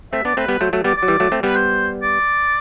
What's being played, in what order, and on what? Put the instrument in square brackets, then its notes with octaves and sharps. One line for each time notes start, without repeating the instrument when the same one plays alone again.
[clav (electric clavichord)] A3 C4 [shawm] E5
[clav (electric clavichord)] B3 D4 [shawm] D5
[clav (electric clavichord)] A3 C4 [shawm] B4
[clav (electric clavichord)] G3 B3 [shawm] B4
[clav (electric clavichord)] F#3 A3 [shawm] C5
[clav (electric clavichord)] F#3 A3
[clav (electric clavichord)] G3 B3 [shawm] D5
[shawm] D5
[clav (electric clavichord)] F#3
E3 G3
F#3 A3
A3 C4
[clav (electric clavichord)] G3 B3 [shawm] B4
[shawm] C5
D5